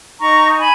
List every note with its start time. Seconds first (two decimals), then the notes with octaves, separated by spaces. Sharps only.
0.21 D#4 A#5 C#6
0.59 G#5 B5